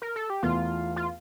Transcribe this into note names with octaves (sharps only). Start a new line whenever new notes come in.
A#4
A4
G4
E2 E3 A3 F4
F4